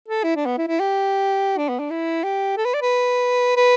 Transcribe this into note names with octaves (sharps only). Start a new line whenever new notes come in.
A4
E4
D4
B3
E4
E4
G4
D4
B3
D4
E4
G4
A4
B4
D5
B4
B4